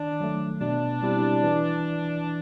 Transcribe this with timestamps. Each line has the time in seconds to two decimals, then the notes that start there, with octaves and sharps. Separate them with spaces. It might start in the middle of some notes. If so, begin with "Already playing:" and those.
Already playing: D#3 D4
0.20 F#3 A3
0.61 B2 D4
1.02 G3 C4 E4 G4
1.43 E3